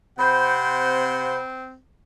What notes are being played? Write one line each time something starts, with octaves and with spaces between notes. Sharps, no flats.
C3 C4 C5 F#5 B5 G6